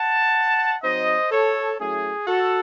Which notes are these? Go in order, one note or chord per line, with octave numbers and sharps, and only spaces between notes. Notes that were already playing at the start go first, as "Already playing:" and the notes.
Already playing: F#5 A5
F#3 C4 D#4 C5 D#5
A4 C#5
F#3 A3 C#4 E4 G#4
F#4 A4